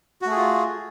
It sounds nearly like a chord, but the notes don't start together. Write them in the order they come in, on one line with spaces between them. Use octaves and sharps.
F#4 A3 G#4 F4